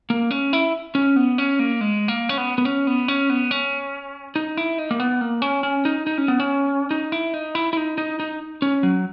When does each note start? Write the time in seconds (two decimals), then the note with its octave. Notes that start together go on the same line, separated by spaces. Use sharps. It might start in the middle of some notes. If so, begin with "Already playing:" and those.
0.10 A#3
0.31 C#4
0.53 E4
0.95 C#4
1.16 B3
1.38 C#4
1.59 A#3
1.81 G#3
2.08 A#3
2.29 C#4
2.37 B3
2.58 B3
2.65 C#4
2.87 B3
3.08 C#4
3.30 B3
3.51 C#4
4.36 D#4
4.57 E4
4.78 D#4
4.91 A#3
5.00 B3
5.21 A#3
5.42 C#4
5.63 C#4
5.85 D#4
6.07 D#4
6.18 C#4
6.28 B3
6.40 C#4
6.91 D#4
7.12 E4
7.34 D#4
7.55 E4
7.73 E4
7.77 D#4
7.98 D#4
8.20 D#4
8.62 C#4
8.83 F#3